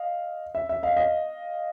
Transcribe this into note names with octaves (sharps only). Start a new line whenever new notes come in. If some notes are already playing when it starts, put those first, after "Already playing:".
Already playing: D#5 F5
E5
E5
D#5 F5
D#5 F5